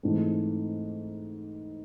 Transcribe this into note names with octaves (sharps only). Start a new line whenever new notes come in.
G#2 E3 A3 C4